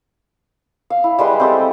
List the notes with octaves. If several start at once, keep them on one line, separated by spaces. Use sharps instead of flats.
F5
E4
G3 G#3 B4 C6
C4 G4 A4